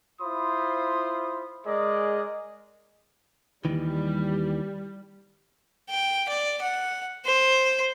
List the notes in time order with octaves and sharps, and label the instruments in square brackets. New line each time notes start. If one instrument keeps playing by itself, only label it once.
[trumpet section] E4 F4 C5 B5 C6 D#6
G#3 G#4 A#4 D5 D#5
[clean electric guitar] D#2 D#3 E3 [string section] G3
[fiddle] G5
D5
F#5
C5